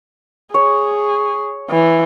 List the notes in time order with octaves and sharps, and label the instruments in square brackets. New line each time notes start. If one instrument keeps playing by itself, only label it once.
[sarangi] G#4 [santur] C#5
[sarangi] E3